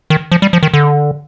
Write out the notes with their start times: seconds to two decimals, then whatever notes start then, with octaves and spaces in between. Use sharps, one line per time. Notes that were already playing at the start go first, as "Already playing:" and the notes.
0.10 D#3
0.32 F3
0.42 G3
0.53 F3
0.63 D#3
0.74 D3